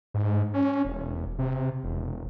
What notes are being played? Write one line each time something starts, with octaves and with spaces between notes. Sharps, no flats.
G#2
C#4
E1
C3
E1